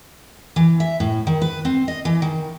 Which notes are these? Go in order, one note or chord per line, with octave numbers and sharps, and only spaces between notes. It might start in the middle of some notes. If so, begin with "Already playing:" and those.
E3
E5
A2
D#3
B4
C4
D#5
E3
D#3